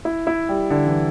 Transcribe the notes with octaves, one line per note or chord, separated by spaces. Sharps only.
E4
E4
G3
D3
E3